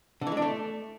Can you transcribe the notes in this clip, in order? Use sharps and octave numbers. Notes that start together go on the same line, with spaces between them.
D3
E3
G#3
D4
A3